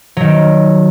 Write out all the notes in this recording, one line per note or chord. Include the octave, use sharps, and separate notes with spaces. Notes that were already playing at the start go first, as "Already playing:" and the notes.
D#3 F#3